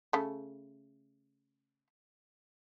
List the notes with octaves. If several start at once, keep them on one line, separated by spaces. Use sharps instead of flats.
C#3 A3